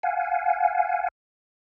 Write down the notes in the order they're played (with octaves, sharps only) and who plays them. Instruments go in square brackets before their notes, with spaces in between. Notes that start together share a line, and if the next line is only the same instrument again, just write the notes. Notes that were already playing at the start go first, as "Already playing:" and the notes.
[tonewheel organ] F5 F#5 G#5